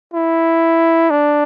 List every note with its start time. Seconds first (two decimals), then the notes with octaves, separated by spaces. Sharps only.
0.14 E4
1.11 D4